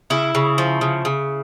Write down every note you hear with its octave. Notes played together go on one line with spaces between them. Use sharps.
C#3 E4
C#3
F3
C#3
C#3